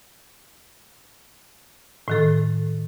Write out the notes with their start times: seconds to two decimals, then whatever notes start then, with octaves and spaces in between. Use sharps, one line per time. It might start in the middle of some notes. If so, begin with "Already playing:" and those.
2.08 A2 D#3 A4